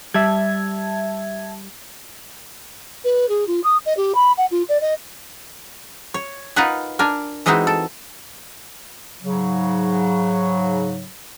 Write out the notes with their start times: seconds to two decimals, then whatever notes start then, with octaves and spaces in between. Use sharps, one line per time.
0.14 G3 E5 A5 G#6
3.04 B4
3.29 G#4
3.47 F4
3.64 D#6
3.85 D#5
3.97 G4
4.14 B5
4.37 F#5
4.51 F4
4.68 D5
4.81 D#5
6.14 C#5
6.56 D#4 F4 A#4 B4 F#5 G#5
6.99 D4 A#4 G#5
7.46 E3 G#3 C4 D#4 E4 F#4
7.67 A4
9.22 G#2 C#3 F#3